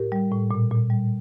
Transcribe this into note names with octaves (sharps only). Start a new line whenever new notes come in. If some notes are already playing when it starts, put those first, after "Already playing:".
Already playing: A2 G4 A#4
G3
A2
A#2
A#2
G3